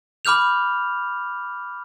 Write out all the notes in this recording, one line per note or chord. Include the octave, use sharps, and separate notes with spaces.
B5 D6 F6 G6 F7